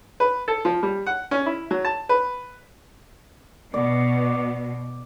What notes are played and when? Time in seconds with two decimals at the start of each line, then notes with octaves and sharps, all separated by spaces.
0.20 B4
0.48 A4
0.65 F3
0.83 G3
1.06 F#5
1.31 C#4
1.46 E4
1.71 F#3
1.85 A5
2.09 B4
3.74 B2 D5